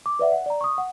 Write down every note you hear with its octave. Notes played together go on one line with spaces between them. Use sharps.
D6
B4 D5 E5 F#5
F#5
D5 A#5
C#6 D#6
F#5